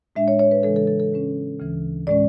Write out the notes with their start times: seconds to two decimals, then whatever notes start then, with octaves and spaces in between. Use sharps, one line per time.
0.16 A2 G#3 D4 E5
0.28 C#5
0.39 C#5
0.51 B4
0.63 C#3 E3 G#3 D4 A4
0.76 A4
0.87 A4
1.00 A4
1.12 C#3 G#3 C#4
1.60 D2 C#3 E3
2.07 A2 G#3 C#4 D5